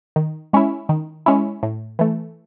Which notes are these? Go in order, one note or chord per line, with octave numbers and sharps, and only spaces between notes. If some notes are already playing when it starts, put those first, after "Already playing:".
D#3
G#3 C#4 E4
D#3
G#3 C#4 E4
A2
E3 A3